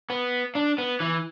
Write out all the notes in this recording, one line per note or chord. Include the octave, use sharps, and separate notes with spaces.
B3
D4
B3
E3